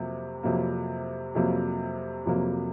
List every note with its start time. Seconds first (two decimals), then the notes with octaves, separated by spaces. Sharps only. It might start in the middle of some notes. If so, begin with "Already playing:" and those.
Already playing: F2 C3 F#3 A#3
0.43 F2 C3 F#3 A#3
1.35 F2 C3 F#3 A#3
2.26 F2 C3 F#3 A#3